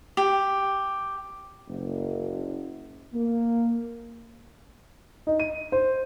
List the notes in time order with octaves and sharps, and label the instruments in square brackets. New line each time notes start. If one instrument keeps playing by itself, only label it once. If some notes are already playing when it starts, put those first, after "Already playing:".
[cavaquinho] G4
[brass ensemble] F#1
A#3
[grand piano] D#4
D#7
C5